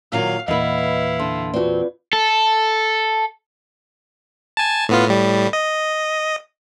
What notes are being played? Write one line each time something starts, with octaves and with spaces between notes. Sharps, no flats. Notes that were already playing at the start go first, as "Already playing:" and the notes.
A#2 D#3 F#3 F5
E2 A#2 E4 B4 D#5 F5 F#5
D3 C6
C4 F4 F#4 B4 D5
A4
G#5 A5
A2 B3 F4
A2 G3
D#5